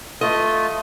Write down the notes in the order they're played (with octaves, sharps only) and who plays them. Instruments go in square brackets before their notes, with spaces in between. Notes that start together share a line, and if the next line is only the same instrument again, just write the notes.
[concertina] A3 F4 [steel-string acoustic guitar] D#5